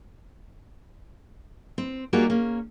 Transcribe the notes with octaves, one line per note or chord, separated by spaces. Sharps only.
C4
G3 A#3 D#4 F4 F#4 G#4
A#3 C#4